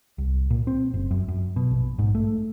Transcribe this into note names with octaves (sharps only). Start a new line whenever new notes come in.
C2
A#2
C4
F#1
F#2
F#2
B2
A#1
G#2
A3